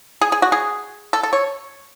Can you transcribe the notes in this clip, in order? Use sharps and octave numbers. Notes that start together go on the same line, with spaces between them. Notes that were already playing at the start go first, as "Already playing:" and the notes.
G#4
G#4
F#4
G#4
A4
A4
C#5